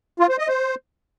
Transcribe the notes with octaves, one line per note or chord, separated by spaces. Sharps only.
F4
C5
D#5
C5